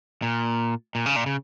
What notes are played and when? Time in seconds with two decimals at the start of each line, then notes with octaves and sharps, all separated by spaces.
0.22 A#2
0.95 A#2
1.06 C#3
1.16 A#2
1.26 C#3